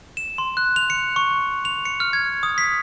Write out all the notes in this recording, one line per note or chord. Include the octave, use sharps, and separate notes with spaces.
E7
C6
F#6
F7
C#7
C#6
F7
C#7
F6
G#6
D#6
B6